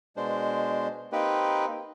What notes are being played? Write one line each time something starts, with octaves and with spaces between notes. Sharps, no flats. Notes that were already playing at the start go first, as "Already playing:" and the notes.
B2 G#3 D4 C5
A#3 C4 D#4 G4 B4